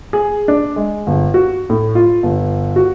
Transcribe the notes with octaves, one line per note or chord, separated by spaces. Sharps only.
G#4
D4
G#3
G1
F#4
A2
F4
G1
F#4